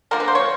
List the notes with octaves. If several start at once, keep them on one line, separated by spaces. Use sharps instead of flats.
D3 F3 A#3 A#4
B4
C5
C#5